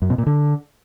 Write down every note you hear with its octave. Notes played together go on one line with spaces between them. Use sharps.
F#2
B2
A#2
D3